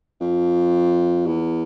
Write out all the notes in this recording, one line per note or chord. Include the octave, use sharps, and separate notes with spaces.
F2
E2